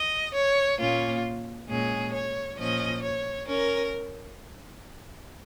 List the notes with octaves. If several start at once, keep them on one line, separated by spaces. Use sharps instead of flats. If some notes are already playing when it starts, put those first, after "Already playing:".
Already playing: D#5
C#5
A#2 A#3 C#4 F4
A#2 G#3 C#4 G#4
C#5
A#2 F3 C#4 D#5
C#5
C#4 A#4